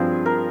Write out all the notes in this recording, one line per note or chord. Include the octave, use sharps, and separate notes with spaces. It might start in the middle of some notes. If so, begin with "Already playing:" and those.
Already playing: G2 F3 C4 F4 G#4
A#4